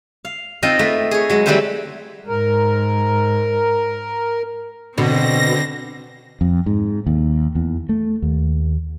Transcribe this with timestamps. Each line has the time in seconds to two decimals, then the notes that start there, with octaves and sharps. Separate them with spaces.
0.25 F5
0.63 C4 D#4 F4 A#4 D#5
0.79 A3 F4 B4
1.11 G#4 C#5
1.30 F#3 G#3
1.46 E3 G3 A3 C4 B4 C5
2.27 G#2 A#4
4.98 B2 D3 C4 A#6
6.41 F2
6.66 G#2
7.06 D#2
7.55 E2
7.89 A3
8.22 D#2